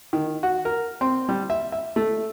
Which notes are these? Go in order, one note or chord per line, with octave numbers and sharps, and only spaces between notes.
D#3
F#4
A#4
C4
G3
E5
E5
A3